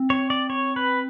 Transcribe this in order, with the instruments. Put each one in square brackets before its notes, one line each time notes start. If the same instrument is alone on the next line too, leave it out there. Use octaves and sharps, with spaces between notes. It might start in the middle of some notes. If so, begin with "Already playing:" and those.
Already playing: [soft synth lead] C4
[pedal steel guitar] C#5
D5
C#5
B4